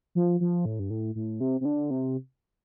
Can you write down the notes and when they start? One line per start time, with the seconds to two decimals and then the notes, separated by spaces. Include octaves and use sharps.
0.15 F3
0.40 F3
0.65 A2
0.79 G2
0.90 A2
1.15 A2
1.40 C3
1.61 C3
1.65 D3
1.91 C3